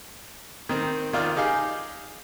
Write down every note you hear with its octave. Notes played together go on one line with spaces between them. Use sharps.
D#3 C4
D#3 F4 D5 F6
D#4 G4 G#4 F5